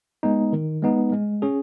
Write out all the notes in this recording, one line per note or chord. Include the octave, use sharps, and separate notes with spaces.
G#3 B3 D#4
D#3
G#3 B3 D#4
G#3
C#4 G#4